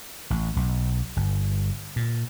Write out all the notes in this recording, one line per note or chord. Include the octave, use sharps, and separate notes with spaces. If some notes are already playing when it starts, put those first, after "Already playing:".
A1
B1
G1
A#2